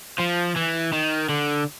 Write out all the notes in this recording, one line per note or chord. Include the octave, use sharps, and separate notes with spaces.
F3
E3
D#3
D3